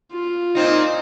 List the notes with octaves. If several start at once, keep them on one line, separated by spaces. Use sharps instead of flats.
F4
A#2 C4 D#4